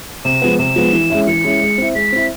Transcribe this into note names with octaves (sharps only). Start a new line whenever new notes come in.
C3 E7
F3 G#3 B3
C3 E7
F3 G#3 B3
E3
G#3 C#4 E4
E3 C#7
G#3 C#4 E4
G#3
C4 E4
G#3 B6
C4 E4